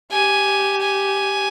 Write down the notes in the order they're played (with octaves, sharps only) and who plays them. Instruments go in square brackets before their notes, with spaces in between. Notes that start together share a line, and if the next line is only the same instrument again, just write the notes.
[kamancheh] G4 [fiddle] G#5
[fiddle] G#5